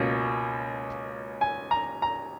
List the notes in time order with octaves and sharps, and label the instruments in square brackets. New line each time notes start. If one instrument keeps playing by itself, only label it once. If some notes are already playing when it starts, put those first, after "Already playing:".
Already playing: [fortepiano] C#2 B2 A#3 C#4
G#5
A#5
A#5